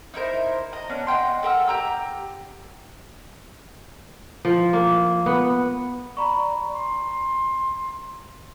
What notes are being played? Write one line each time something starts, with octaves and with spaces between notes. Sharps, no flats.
D#4 E4 A#4 C5
D#5 A#5
B3 C#4 D4
D#5 F#5 G5 C6
A4 A#4 F#5 E6
G4 A#5 E6
F3
A#3
B3
D5 A#5 B5 C#6
C6